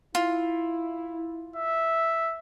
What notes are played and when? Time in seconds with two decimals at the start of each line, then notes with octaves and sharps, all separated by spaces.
0.15 E4 F4
1.56 E5